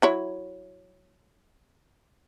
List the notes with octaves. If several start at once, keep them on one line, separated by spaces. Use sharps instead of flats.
F#3 E4 C#5